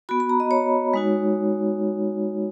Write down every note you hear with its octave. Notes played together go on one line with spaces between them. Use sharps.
B3 F#4 B5
B5
A#5
D#5
C#5
G#3 D#4 F#4